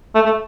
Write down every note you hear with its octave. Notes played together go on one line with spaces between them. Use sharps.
A3
A3